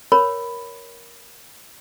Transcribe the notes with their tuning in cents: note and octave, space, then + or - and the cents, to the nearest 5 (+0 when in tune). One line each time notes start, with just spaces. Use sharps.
A#4 +10 C#5 +10 B5 +5